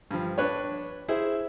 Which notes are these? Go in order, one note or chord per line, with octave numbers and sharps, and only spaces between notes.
G2 F3
D4 B4 C#5
E4 G#4 C5